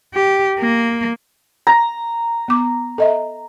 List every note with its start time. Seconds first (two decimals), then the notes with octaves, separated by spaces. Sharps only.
0.14 G4
0.59 A#3
1.67 A#5
2.48 B3 D6
2.98 A4 D#5 E5